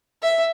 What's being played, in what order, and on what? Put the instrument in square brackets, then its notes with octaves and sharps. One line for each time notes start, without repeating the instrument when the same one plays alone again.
[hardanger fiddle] E5